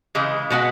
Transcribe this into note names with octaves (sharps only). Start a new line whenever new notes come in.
C#3 E3 G#3
B2 G#3 B3 F#4